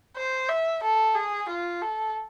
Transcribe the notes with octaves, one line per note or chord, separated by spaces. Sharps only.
C5
E5
A4
G#4
F4
A4